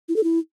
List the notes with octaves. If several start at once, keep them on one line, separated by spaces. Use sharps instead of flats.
E4
A4
E4